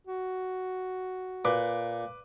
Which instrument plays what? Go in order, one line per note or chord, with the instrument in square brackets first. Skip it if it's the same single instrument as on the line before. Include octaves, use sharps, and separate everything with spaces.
[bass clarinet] F#4
[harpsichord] A#2 [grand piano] B4 D6